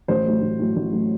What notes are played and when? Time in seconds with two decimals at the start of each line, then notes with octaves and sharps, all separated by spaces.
0.08 A1 C5
0.25 A2 F#3 A3
0.42 A1
0.59 A2 F#3 A3
0.76 A1
0.92 A2 F#3 A3